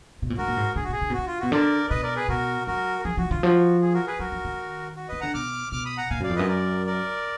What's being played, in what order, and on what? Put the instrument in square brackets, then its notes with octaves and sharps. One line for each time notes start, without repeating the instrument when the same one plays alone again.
[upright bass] B2
A#2
[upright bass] G#2 [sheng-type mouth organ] F#4 A#4
[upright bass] A#2
G#2
[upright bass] D3 [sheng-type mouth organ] G#4
[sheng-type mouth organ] F#4
[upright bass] B2 [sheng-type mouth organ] G#4
[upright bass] D3
B2
[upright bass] D3 [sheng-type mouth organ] F#4
[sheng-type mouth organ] F4
[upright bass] B2 [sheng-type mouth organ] F#4
[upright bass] D3 [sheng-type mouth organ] A#4 D5
[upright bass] B2 [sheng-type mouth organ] B4 D#5
[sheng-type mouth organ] A#4 D5
G#4 B4
[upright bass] B2 [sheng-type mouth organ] F#4 A#4
[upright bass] F#3 [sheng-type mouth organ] F#4 A#4
[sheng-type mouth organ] A#4
[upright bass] F3 [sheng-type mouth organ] G#4
[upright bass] F3 [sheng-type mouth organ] F#4
[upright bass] D#3 [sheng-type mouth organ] F4
[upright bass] F3 [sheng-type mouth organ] F#4
[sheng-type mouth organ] G#4
F#4 A#4
G#4 B4
[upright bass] F#3 [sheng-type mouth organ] F#4 A#4
[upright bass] F3
D#3
[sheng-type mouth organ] F#4
[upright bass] D#3 [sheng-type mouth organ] B4 D#5
[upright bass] D3 [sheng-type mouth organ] F#5 A#5
[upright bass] B2 [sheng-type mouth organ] D6 F6
[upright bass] B2 [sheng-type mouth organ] D6 F6
[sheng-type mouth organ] B5 D#6
F#5 A#5
[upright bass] A#2 [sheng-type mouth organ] F5 G#5
[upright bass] F#2 [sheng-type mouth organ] D5 F5
[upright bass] F2
[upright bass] F#2 [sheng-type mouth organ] B4 D#5
[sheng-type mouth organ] A#4 D5
A#4 D5